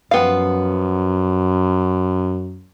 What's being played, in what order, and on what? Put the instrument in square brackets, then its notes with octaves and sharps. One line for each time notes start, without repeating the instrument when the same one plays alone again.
[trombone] F#2 [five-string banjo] F3 B3 F5